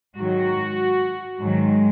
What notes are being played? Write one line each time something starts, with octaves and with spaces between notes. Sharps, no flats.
G#2 D#3 F#3 F#4
G#2 D#3 F#3 G#3